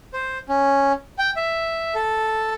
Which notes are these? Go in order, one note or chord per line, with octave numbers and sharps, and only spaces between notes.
C5
C#4
G5
E5
A4